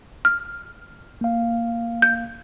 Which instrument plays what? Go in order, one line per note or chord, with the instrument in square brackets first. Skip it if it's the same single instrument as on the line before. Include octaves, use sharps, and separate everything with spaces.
[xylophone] F6
[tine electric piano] A#3 F5
[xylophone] G6